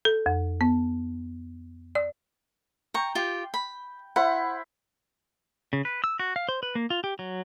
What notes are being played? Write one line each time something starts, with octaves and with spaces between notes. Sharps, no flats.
A4
F2
B3
D5
G5 A#5 C#6
F4 G4
B5
E4 C5 F#5 B5
C#3
B4
E6
F#4
F5
C5
B4
A#3
F4
G4
F#3